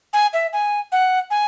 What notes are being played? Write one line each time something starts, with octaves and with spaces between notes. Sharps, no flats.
G#5
E5
G#5
F#5
G#5